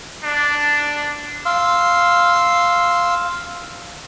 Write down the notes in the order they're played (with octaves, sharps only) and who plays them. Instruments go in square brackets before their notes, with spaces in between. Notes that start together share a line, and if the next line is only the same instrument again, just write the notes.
[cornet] D4
[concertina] F5 C6 E6